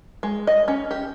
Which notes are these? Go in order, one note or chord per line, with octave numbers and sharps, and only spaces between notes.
G#3
D#5
C#4
G4